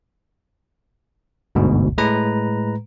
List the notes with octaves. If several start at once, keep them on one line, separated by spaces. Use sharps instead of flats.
G1 D2 G#2 B2
A2 G#3 B4 A#5